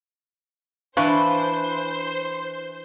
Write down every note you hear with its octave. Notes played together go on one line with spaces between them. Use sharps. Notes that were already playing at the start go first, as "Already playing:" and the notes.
E3 D4 B4 C5 F5 C#6